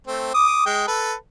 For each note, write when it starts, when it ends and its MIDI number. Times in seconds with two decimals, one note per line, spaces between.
0.07 0.31 57
0.07 0.31 60
0.34 0.61 86
0.34 0.61 87
0.66 0.84 56
0.66 0.84 79
0.88 1.14 69
0.88 1.14 71